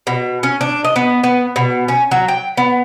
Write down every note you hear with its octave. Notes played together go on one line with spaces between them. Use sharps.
B2
C#4
D4
D#5
B3
B3
B2
C#4
F#3
G5
B3